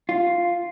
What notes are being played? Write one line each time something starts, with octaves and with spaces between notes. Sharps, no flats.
F4